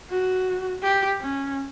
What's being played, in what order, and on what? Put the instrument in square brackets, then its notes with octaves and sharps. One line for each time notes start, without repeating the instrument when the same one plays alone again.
[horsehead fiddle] F#4
G4
C#4